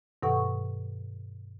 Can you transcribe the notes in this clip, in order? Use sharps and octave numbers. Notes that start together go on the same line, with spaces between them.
G2 B2 D#3 A4 F#5 C#6